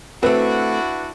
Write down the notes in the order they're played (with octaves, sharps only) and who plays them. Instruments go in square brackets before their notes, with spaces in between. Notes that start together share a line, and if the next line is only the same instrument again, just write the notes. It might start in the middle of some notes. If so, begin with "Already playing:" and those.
[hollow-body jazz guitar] A3 C4 [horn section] D4 E4 F#4 [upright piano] B4